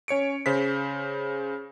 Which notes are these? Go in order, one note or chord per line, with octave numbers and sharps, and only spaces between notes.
C#4 C#5 C#7 D7
C#3 C5 B6